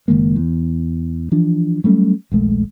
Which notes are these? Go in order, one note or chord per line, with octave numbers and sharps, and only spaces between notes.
F#1 D#3 G#3 A#3
E2
E3 F3 D4
F#3 G3 A3 C#4
D#1 A#1 G#3 A3